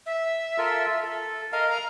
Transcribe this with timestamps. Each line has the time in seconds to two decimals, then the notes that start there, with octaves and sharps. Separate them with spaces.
0.06 E5
0.58 F4 A4 A#4
1.03 A4
1.52 A#4 D#5 F5
1.70 A#5